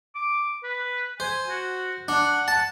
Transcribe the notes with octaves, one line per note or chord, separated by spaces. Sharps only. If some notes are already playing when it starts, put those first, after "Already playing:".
D6
B4
C5 G#5
F#4
D4 F#5
A5